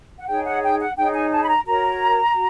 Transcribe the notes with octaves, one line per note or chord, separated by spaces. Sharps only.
F#5
D#4 G#4 C#5 G5
F#5
G5
F#5
D#4 G#4 C#5 G5
G#5
A5
B5
A#5
F#4 A#4 C#5 A#5
F#4